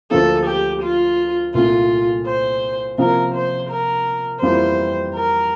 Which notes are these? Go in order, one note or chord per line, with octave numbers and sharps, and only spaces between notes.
D2 D3 F3 A#3 A4
G4
F4
C2 A#2 A3 F4
C5
C3 F3 A#3 A#4
C5
A#4
F2 E3 G3 A#3 E4 C5
A#4